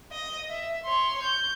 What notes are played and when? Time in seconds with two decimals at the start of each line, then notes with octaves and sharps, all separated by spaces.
0.12 D#5
0.50 E5
0.85 C#5 C6
1.23 G6